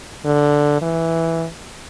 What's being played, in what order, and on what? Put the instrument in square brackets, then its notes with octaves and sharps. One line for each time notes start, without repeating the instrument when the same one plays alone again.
[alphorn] D3
E3